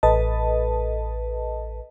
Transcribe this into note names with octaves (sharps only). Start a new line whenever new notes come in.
A1 A4 B4 D#5 A5